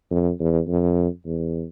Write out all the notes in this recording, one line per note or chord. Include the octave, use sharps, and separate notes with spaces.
F2
E2
F2
E2